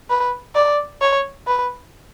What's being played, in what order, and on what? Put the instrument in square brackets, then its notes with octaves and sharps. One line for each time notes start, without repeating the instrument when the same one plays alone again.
[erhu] B4
D5
C#5
B4